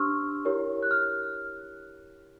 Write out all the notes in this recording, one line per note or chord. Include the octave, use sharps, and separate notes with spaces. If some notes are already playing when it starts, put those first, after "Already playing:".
Already playing: D4 G4 C5 C6 C#6 E6 F6
E4 G4 A#4 C#5
F#6
F6